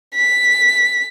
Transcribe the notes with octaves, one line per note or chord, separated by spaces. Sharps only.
B6